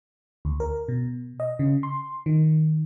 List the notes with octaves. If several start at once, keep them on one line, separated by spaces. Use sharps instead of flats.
D2
A#4
B2
D#5
C#3
C6
D#3